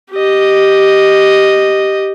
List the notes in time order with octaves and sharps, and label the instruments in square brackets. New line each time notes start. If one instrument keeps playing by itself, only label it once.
[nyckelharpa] G4 D#5